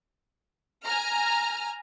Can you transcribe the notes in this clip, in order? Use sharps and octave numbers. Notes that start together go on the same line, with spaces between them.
G#5 A#5 F6